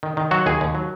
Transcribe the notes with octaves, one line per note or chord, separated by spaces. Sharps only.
D#3
D#3
F#3 F#4
D#2 G#4
D#2
F#3